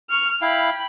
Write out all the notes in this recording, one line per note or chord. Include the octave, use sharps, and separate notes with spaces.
C#6 F6
E4 F5 G5 B5